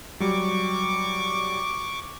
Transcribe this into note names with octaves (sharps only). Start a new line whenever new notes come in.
F#3 G3 C#6 D6